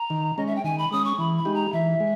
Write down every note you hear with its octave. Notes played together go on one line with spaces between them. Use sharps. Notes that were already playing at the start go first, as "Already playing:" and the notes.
Already playing: A#5
D#3
G#3 C#4 D#5
E5
G5
D#3 G#5
B5
G#3 C#4 D#6
C#6
E3 B5
B5
G#3 D#4 G4
A#5
E3 E5
G#3